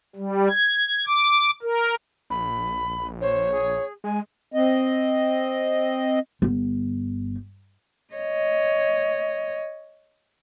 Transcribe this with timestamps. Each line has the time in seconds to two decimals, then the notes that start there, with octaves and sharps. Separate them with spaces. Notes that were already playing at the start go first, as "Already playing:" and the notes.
0.16 G3
0.50 G#6
1.07 D6
1.63 A#4
2.30 A#1 B5
3.21 C5 C#5
3.51 G#4
4.04 G#3 G#5
4.54 C4 D#5
6.42 G1
8.13 C#5 D#5